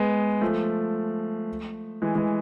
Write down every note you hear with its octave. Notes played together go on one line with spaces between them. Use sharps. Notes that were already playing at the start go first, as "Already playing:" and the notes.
Already playing: G#3 B3
F3 A3
E3 G#3
E3 G#3